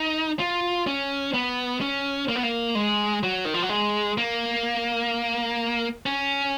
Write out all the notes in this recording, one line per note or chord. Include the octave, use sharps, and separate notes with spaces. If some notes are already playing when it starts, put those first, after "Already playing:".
Already playing: D#4
F4
C#4
B3
C#4
A#3
B3
A#3
G#3
F#3
D#3
F3
F#3
G#3
A#3
C#4